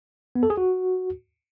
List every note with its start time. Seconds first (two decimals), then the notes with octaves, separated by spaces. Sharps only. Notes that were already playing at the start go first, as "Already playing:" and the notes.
0.35 B3
0.43 A4
0.50 G#4
0.57 F#4